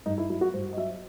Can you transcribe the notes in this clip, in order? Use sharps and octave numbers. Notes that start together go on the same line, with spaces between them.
G2 D#4
E4
F#3 E4
F#4
G2 C5
D#5
F#3 E5